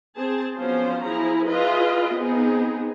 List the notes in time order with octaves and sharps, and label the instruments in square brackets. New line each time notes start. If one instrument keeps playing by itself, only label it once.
[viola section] C4 G#4 C5 A5
F3 F#3 B3 C#4 F4 C5
F3 E4 G#4 A#5
F4 G#4 B4 D#5 E5
B3 C4 D#4 G#4